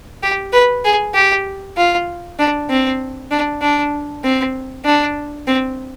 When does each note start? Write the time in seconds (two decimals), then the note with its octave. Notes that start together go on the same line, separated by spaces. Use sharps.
0.23 G4
0.53 B4
0.84 G#4
1.14 G4
1.77 F4
2.39 D4
2.70 C4
3.31 D4
3.62 D4
4.24 C4
4.85 D4
5.47 C4